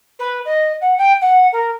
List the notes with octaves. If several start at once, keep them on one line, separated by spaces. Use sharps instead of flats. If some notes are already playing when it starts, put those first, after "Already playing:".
B4
D#5
F#5
G5
F#5
A#4